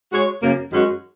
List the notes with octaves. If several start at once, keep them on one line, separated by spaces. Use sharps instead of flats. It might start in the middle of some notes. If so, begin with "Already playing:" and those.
G#3 F#4 C#5
F#2 C#3 A#3
F#2 D#3 G#3 C#4 F#4